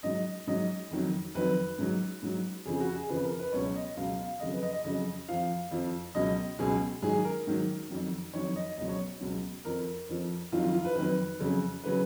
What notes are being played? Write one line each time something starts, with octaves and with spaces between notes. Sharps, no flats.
G#2 F#3 D#5
G#2 F#3 D#5
F2 D#3 F#3
F2 D#3 F#3 B4
G#2 F#3
G#2 F#3
F2 C#3 F3 G#4
F#4
G#4
F2 C#3 F3 B4
A#4
B4
C#2 B2 F#3 C#5
D#5
C#2 B2 F#3 F5
F5
F2 C#3 F#3 D#5
B4
D#5
D#5
F2 C#3 F#3 D#5
F2 F3 F5
F2 F3
C#2 B2 F#3 D#5
C#2 B2 F#3 G#4
G#2 D#3 F#3 G#4
A#4
G#2 D#3 F#3
F2 D#3 F#3
F2 D#3 F#3 C#5
D#5
C#2 B2 F#3 D#5
C#5
C#2 B2 F#3
F2 F3 A#4
F2 F3
F2 D#3 F#3 F4
F4
F4
B4
F2 D#3 F#3 B4
F2 C#3 F#3
C#3 F#3 B4